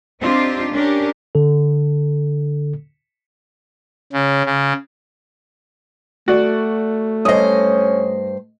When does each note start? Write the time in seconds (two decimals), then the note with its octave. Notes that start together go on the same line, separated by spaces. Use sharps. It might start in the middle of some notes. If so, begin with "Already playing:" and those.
0.21 C4 D4 D#4 F4 G4
0.73 C#4 D4 G4 A#4
1.35 D3 A4
4.13 C#3
4.46 C#3
6.28 A3 F#4 D5
7.25 G2 C#4 C5 D#5 D#6